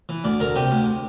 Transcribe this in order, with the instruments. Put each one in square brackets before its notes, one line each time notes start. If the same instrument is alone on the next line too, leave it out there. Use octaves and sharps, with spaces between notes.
[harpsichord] E3
D2 D5
D2 A#4
C3 G4
D2